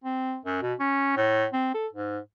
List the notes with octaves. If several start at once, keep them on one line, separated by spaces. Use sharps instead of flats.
C4
F#2
B2
C#4
A2
C4
A4
G#2